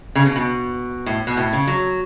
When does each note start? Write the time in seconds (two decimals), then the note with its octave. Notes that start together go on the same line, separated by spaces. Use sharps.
0.15 C#3
0.25 B2
0.36 B2
1.06 A2
1.27 B2
1.37 A2
1.53 C#3
1.67 F#3